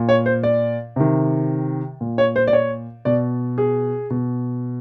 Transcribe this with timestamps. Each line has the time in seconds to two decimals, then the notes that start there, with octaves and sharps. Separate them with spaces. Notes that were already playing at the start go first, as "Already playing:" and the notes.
Already playing: A#2
0.09 C#5
0.26 C5
0.43 D5
0.96 C3 D#3
2.01 A#2
2.18 C#5
2.36 C5
2.47 D5
2.53 C#5
3.05 B2 D5
3.58 G#4
4.10 B2